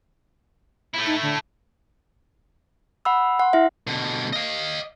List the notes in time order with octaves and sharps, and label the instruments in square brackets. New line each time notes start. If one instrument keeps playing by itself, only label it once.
[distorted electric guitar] A3 E4
[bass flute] D#4
D3
[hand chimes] F#5 B5 E6
F#5 C6
E4 E5
[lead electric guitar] B2 D3
D#5 F5